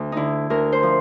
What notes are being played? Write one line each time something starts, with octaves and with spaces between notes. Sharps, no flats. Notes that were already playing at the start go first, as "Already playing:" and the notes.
Already playing: D2
D3 D#4 E4
D2 A#4
C5
F3